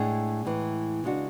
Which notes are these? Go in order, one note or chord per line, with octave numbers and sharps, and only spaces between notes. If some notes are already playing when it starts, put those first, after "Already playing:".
Already playing: A2 G#3 D4 G#4
A2 E3 G#3
C#3 G#3 D4 F#4